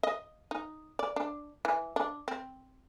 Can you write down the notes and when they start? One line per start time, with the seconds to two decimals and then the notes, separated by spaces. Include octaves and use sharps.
0.03 D#5
0.51 D#4
0.99 D5
1.16 D4
1.65 E3
1.96 D4
2.28 C4